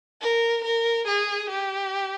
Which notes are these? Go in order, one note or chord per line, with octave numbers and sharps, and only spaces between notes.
A#4
A#4
G#4
G4